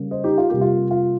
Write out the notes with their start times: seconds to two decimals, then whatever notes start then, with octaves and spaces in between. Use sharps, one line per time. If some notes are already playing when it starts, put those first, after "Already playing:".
Already playing: C#3 G3 A#3
0.11 C5 D#5
0.24 D#4 G4
0.38 F4
0.50 C3 G3 A#3 G4
0.61 F4
0.91 F4